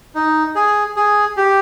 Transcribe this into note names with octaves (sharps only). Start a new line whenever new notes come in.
D#4
G#4
G#4
G4